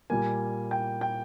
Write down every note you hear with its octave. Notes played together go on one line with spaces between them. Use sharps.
A#2 G3 A#3 G#5
G5
G5